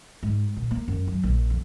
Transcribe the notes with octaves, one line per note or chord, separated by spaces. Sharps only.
G#2
A#2
A#3
F#2
F#3
A#1
F2